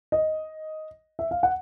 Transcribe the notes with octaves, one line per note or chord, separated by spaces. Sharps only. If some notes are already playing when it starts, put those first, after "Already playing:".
D#5
E5
F5
F#5